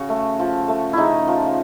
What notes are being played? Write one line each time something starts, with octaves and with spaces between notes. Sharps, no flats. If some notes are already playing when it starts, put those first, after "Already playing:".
Already playing: C#3 F#4
A3
F3
A3
C#3 D#4 E4
F3